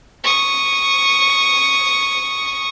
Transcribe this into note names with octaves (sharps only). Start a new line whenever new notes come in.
C#6 D#6